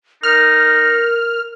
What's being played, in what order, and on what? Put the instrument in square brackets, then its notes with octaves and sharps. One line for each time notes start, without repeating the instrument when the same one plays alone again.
[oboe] D#4 [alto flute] A#4 [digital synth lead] F6